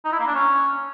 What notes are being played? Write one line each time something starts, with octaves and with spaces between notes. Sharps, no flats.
D#4
E4
A#3
D4
C#4